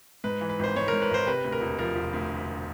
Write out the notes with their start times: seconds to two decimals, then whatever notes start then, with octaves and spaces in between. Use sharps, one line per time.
0.24 G#2 B4
0.41 E3
0.49 B4
0.59 G#1 C5
0.76 G#2 C#5
0.88 G#2 A#4
1.02 B4
1.11 G#1 C5
1.27 C3 B4
1.44 D2
1.52 A#4
1.61 E1
1.78 F3 A#4
1.95 E1
2.13 D2